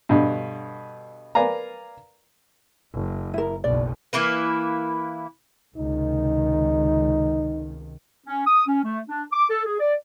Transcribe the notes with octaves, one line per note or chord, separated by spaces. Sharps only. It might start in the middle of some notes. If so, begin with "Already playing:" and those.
G2 B2 D3
A#4 B4 D5 F5 G#5 A#5
F#1
E4 A#4
F#1 B1 D5
E3 A#3 E4 B4
C#2 C3 D#3 D#4
C#4
D#6
C#4
A3
D4
D6
A4
G#4
D5